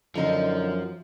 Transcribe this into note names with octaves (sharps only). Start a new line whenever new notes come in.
F#2 D3 F3 D#4